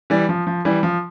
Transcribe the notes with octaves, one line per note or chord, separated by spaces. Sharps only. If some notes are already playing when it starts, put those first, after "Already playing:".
E3 G3
F3
F3
E3 G3
F3